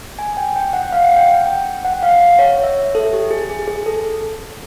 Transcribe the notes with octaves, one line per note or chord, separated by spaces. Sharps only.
G#5
G5
G5
F#5
F5
F#5
G5
G5
G5
F#5
F5
C#5
E5
A4
G4
G#4
G#4
G#4
A4